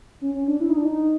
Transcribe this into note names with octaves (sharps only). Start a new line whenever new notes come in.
C#4
C#4
D4
E4
D#4
D4
D#4